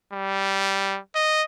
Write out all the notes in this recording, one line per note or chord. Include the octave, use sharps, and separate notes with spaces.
G3
D#5